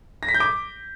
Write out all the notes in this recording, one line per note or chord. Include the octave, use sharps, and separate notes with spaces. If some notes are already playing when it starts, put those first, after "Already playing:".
A#6
B6
G6
D6